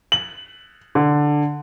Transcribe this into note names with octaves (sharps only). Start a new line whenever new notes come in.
F#7
D3